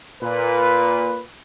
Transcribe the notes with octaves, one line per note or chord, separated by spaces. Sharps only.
A#2 B4